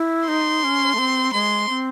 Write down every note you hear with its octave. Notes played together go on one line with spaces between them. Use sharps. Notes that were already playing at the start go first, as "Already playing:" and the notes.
Already playing: E4
D#4 C6
C#4
A3
C4
G#3 C6
C4